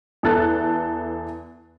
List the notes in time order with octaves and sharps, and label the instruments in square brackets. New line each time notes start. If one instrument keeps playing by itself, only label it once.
[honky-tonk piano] E2 E3 A4 F#6 A6